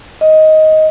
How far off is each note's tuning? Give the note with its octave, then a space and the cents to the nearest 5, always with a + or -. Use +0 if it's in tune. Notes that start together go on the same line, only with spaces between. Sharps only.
D#5 +10